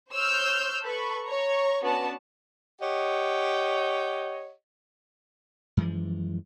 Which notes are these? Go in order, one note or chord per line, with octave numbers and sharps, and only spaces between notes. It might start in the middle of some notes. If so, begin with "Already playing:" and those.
C5 C#5 E6 F6 G6
A4 B4 B5 C#6
C#5 A#5 C#6
B3 C#4 D4 F#4 A5
G4 C#5 D#5 F#5
F#2 E3 F3 G#3